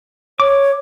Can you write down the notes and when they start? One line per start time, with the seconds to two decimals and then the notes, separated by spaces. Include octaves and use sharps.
0.40 C#5 D6